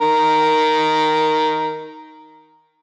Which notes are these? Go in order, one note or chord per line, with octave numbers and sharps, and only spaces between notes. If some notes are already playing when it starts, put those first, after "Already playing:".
D#3 A#4